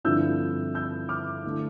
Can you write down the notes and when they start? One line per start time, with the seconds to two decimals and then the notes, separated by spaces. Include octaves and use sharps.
0.04 G2 D3 F3 C4 E4 E6 G6
0.75 E6 G6
1.09 D6 F6
1.44 D3 A3 E4